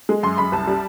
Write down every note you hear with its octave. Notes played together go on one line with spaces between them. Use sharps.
G#3
F#2 C6
F#2 B5
C2 A5
G3